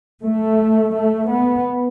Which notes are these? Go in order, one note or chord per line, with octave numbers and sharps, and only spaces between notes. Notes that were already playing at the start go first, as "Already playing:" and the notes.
A3
A3
B3